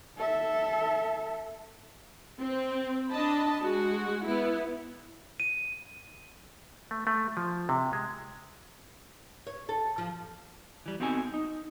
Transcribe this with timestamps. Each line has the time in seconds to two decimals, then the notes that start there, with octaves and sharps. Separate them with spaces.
0.18 A4 E5
2.41 C4
3.09 D4 D#5 A5 B5
3.63 G#3 F#4
4.26 B3 E4
5.40 D#7
6.91 A3
7.07 A3
7.37 F3
7.69 C3
7.93 G#3
9.47 C#5
9.69 A4
9.98 F3
10.86 E3 G3
11.00 B3 C4 D#4 F#4 A4 G#5
11.34 D#4